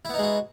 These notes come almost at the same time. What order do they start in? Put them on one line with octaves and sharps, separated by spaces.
E4 B3 D#4 G#3 F#4